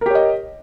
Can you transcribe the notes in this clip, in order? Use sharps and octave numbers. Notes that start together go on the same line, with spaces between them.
G4 A#4 C#5 D#5